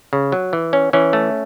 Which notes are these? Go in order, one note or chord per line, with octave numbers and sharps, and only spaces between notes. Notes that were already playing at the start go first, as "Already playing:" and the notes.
C#3
F#3
E3
C#4
E3 C#4
A3